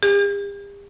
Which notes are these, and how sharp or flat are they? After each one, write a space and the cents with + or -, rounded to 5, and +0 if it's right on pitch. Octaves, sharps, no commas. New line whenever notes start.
G4 +40